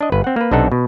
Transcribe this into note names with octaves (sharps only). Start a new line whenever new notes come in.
D4 D#5
G1 B4
C4 F#5
A#3 B4
B1 C3 D4 D#4 A4 F#5
B2